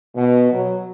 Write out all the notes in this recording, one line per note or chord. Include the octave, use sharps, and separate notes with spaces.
B2
F#3